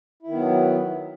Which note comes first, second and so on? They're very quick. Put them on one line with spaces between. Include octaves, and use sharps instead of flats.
E4 D#3 B3 F#3